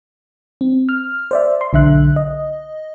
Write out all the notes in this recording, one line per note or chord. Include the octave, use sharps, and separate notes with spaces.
C4
F6
C5 D5 E5
C6
B1 D3 E5 F#6
D#5